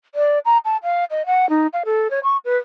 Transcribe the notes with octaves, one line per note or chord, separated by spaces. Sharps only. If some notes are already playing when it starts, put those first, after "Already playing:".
D5
A#5
A5
F5
D#5
F#5
D#4
F5
A4
C#5
C#6
B4